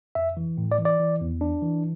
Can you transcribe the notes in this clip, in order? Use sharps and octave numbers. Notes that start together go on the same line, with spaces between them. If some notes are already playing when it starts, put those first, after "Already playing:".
F2 E5
E3
A2
D5
E3
D5
E3
E2
D4
E3